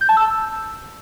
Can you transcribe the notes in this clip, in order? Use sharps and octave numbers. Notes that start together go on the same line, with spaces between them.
G6
A5
E6